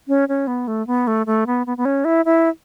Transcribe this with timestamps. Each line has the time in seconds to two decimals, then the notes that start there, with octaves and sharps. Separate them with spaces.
0.08 C#4
0.29 C#4
0.47 B3
0.68 A3
0.87 B3
1.07 A3
1.26 A3
1.47 B3
1.67 B3
1.77 B3
1.85 C#4
2.05 E4
2.25 E4